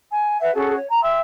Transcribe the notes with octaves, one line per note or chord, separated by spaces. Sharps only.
G#5
B4 E5 F#5
C#4 F#4 G#4 A4
C#5
A#5
E5 G5 C6 E6